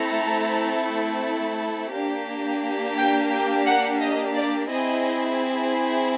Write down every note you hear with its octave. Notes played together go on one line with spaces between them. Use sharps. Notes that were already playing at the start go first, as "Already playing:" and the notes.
Already playing: A3 C4 E4 A4 A#5
A#3 D4 G4
G5
G5
F#5
D#5
D5
C4 E4 G#4 D#5